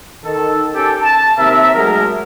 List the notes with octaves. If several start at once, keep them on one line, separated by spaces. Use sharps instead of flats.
D#3 A4
C#4 G4 A4
A5
D#2 C3 A#4 E5
F#3 G#3 A3 A4 A#4